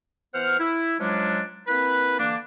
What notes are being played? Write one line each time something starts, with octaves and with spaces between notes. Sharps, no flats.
E3 B3 C5 F#5 F6
E4
F3 F#3 G#3 C#4 D4
A#3 C4 E4 B4
D3 E3 A#3 D4